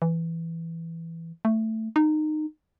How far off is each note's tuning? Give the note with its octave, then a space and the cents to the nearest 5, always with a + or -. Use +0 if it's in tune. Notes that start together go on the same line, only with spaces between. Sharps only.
E3 +5
A3 +10
D#4 -20